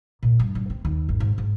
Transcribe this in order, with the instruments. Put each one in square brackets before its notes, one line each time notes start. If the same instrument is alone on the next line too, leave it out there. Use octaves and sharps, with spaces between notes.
[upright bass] A#2
G2
G2
C4
D#2
G#1
G#2
G#2